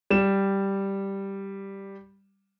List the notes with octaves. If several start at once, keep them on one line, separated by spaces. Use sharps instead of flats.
G3 E7